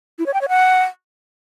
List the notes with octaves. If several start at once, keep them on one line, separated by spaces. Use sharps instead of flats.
E4
C#5
G5
C#5
F#5